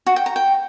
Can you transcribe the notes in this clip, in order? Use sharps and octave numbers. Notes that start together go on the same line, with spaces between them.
F#4
G5
A#5
G5